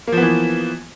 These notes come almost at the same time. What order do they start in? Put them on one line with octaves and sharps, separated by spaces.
A#3 F3 B3 E3